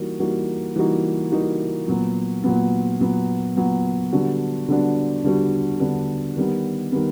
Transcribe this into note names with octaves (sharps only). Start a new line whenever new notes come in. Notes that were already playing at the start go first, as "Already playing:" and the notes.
Already playing: E3 G3 A#3 D#4 F#4
E3 G3 A#3 D#4 F#4
E3 G3 A#3 D#4 F#4
E3 G3 A#3 D#4 F#4
A#2 F#3 B3
A#2 F#3 B3
A#2 F#3 B3
A#2 F#3 B3
D3 G3 B3 D4 F#4
D3 G3 B3 D4 F#4
D3 G3 B3 D4 F#4
D3 G3 B3 D4 F#4
D#3 G3 B3
D#3 G3 B3